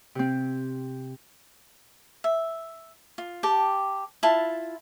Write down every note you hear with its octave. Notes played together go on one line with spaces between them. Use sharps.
C3 C4
E5
F4
G4 G5 A5
E4 F4 A5